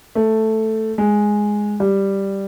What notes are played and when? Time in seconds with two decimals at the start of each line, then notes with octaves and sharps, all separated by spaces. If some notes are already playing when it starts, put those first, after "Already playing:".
0.15 A3
0.98 G#3
1.80 G3